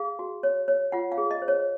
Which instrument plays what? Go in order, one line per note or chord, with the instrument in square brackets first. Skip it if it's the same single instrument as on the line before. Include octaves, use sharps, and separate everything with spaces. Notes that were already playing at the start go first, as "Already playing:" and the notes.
Already playing: [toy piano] G#4 F5
F#4
C#5
C#5
F4 F#5
F5
G#4
D#5
C5
C#5